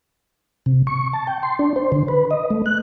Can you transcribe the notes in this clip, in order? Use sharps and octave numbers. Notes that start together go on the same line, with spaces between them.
C3
C#6
A5
G5
C6
D4
C5
D3
B4
D#5
A3
F#6